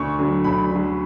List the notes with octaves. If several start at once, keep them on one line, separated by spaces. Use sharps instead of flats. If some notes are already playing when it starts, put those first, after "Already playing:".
Already playing: D2 C#6
D3 F#3
D2 B5
D3 F#3